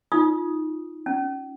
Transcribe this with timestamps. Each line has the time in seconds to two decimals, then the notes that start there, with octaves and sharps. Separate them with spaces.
0.12 D#4 F4 D#6
1.06 C#4